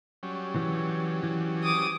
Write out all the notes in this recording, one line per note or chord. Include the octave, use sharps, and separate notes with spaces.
F#3 G3 C#4
E3
E3
D6 D#6